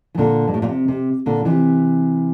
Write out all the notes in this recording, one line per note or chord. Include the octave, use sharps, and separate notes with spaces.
E3
A#2 D3
G2
A2
A#2
C3
C3
A#2 D3
C3 E3